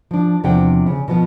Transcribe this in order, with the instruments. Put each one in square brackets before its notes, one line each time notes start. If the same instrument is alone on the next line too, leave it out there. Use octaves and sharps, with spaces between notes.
[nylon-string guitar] F3 D4
E2 C3 F3 D4 F#5 G5
C#3
B2 F3 B3